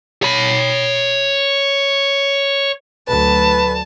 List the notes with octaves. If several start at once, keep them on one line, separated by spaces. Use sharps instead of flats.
C#5 B5
D2 F#3 A4 B4 A5